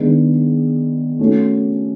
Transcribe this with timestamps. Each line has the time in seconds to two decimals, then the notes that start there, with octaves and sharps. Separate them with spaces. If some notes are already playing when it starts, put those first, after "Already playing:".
Already playing: D#3 G#3 B3 D4
1.19 A3 C#4 F#4